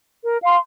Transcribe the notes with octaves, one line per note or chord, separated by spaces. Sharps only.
A#4
F5 C6